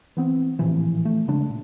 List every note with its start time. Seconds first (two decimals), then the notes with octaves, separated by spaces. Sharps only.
0.17 E3 B3 C4
0.59 A1 A#2 E3 F3
1.05 A3
1.28 C#3 G#3 D4
1.50 A#2